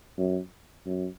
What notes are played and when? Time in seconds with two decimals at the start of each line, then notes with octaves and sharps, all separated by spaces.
0.18 F#2
0.86 F#2